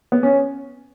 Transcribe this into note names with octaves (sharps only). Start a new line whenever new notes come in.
B3
C#4